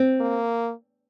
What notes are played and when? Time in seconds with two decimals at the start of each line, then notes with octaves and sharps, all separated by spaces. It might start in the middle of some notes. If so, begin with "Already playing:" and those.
Already playing: C4
0.21 A#3